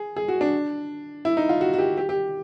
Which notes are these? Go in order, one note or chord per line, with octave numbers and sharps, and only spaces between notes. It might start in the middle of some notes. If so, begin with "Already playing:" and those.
Already playing: G#4
G#4
F#4
D4
E4
D#4
F4
F#4
F#4
G4
G4
G4